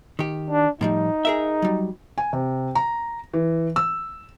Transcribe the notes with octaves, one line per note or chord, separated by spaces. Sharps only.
D#3 G4
D4
A2 F3 G3 D#4
G#4 A#4 E5
F#3 G3
G#5
C3
A#5
E3
E6